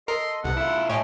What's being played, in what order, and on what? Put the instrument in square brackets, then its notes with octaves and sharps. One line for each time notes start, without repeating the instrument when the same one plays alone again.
[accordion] A4 D#5 [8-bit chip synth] A#4 [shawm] C6
[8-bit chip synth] C2 [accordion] C3 B3 A4 [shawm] F#5
[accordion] A3 [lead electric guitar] E4 F4
[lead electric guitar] A2 [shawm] G4 [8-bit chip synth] C#5 [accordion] D#5 G#5